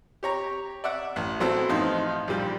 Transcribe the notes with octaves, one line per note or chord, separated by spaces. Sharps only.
G4 C#5 A#5
D5 E5 F#5
A1
E3 F#3 A3 B3 C4 E4
A1 F3 D#4 F4
A#1 A#2 G3